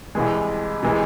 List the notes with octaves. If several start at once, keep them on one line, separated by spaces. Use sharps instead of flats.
C2 C3 E3 G#3
C3 E3 G#3